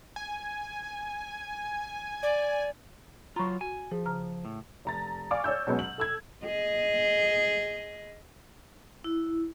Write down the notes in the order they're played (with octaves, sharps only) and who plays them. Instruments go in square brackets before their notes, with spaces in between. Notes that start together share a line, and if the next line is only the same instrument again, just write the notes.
[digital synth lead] G#5
[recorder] D5
[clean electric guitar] F#3 F4 [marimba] A#5 B5 C#6
[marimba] F#4 [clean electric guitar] G#5
[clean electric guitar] F3 [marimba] G#4
[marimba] C#3 A#5 F6
[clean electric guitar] A2
[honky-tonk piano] F1 A#5 A6
D5 F5 G#5 C#6 D6 F6
C#5 D5 E6 G6
B2 F#3 G#3 B3 C#4
F#7
A4 E6 G#6
[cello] G#4 D#5
[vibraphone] E4